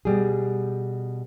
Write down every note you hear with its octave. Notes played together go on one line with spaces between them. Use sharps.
B2 G3 G#4